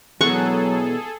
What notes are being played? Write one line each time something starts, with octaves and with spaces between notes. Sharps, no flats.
E2 B2 E3 F#3 G#4 A4 F#5 C#6